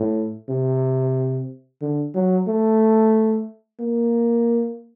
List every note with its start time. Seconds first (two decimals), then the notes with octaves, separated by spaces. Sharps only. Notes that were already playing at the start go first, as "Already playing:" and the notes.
Already playing: A2
0.49 C3
1.82 D3
2.15 F#3
2.48 A3
3.80 A#3